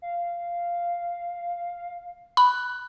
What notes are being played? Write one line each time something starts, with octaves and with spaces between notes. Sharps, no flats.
F5
B5 F#6